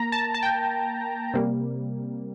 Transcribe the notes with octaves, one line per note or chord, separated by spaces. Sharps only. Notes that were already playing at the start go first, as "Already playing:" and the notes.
Already playing: A#3 A#5
A5
A5
G5
C3 G3 A#3